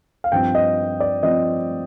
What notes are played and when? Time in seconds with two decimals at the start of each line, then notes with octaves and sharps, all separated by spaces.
0.24 F5
0.32 G2 F3 C4 G5
0.55 D#5
1.00 D5
1.23 F3 C4 D#5